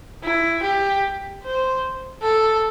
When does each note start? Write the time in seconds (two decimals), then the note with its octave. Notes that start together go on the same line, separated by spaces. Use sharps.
0.23 E4
0.63 G4
1.43 C5
2.22 A4